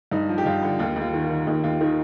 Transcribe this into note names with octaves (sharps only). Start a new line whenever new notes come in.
G2 D#4
F3
G4
G2 F4
D3
D#2 F4
D#2
F4
D#3
F4
D#3
D#2 D#4
D#2 F4
D#3 D#4